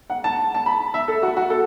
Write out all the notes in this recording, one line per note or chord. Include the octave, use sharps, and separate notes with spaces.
F#5
A5
A5
B5
E5
A4
F#4
F#4
A4